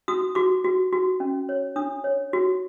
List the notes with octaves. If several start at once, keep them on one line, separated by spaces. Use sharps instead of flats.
F#4 D#6
F#4 D6
F#4
F#4
C#4
C#5
D4 D#6
C#5
F#4